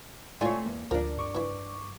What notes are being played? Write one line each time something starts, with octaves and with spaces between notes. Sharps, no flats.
A3 C4 E4 F4 C#5 D5 G#5 C6
E2 A#3
D2 F3 D4 A#4
G2 C#6 D6
E3 E4